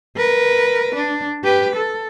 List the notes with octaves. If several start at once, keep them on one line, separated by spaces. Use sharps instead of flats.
A#4 B4
D4
G4 B4
A4